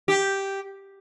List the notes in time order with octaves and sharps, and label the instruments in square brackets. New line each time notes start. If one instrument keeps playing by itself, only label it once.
[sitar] G4